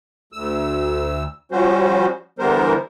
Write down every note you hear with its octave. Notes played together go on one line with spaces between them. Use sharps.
D2 E6
F3 G3 C#4 F#4 C5
D3 E3 G3 B3 A#4 C5